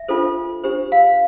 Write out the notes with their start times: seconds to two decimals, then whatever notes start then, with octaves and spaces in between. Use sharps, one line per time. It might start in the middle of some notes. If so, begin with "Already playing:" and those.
Already playing: E5
0.08 D4 F4 A4 C5
0.64 D4 G4 C5
0.92 F5